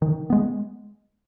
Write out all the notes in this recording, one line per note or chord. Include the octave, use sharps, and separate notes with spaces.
D#3
G#3 B3